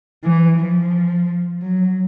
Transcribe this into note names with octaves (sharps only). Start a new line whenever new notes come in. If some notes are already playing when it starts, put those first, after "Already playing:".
E3
F3
F#3